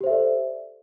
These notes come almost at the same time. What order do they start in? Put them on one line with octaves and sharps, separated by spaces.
G4 C5 E5 A4 D5